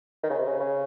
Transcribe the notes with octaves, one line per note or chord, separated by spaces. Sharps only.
D#3
C#3
C3
C#3
C#3